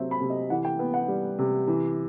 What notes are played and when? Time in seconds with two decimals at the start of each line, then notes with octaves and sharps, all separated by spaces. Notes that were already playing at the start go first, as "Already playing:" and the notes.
Already playing: C3 F#3 C4 E5
0.11 B5
0.21 C3
0.30 D#5
0.50 E3 F#5
0.65 G5
0.79 B3
0.94 F#5
1.08 G3
1.39 C3
1.67 E3